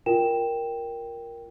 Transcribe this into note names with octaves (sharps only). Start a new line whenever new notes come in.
F4 A#4 G5 E7